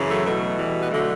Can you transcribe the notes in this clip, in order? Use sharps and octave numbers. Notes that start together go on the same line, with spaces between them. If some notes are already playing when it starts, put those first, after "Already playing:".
Already playing: F#2 C#3 E3
F#3 A3
E2 B2 F#3 A3
E3 G3
B3
D3 F#3 A3